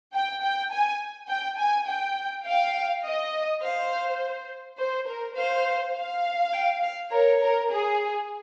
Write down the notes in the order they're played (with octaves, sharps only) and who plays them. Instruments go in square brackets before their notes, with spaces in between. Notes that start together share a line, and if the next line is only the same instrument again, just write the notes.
[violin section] G5
G5
G#5
G5
G#5
G5
[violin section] F5 [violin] G5
[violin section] D#5
[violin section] C5 [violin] F5
[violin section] C5
A#4
[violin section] C5 [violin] F5
[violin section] F5
[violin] G5
F5
[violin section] A#4 [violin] C#5
[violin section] A#4
G#4